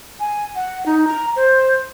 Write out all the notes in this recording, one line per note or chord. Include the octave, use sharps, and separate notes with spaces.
G#5
F#5
D#4
A#5
C5